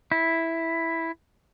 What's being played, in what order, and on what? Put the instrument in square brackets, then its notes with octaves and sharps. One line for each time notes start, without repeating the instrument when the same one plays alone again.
[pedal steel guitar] E4